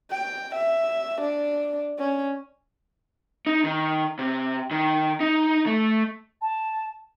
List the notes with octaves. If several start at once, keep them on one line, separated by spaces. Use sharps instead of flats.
G5
E5
D4
C#4
D#4
D#3
C3
D#3
D#4
A3
A5